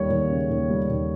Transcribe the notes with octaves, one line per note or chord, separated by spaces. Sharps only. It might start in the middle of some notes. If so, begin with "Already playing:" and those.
Already playing: D#2 G3 C#5
D#2
C#3
D#2
G3
D#2